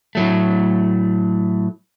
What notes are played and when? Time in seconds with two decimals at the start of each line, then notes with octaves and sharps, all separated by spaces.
0.15 A2 F#3 A3